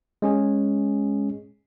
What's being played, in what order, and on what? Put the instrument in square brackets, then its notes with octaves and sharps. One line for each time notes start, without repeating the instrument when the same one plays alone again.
[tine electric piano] G#3 C#4 G#4